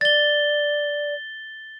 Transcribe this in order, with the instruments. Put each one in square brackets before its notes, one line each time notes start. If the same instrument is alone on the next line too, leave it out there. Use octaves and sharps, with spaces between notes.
[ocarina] D5 [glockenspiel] A6 G7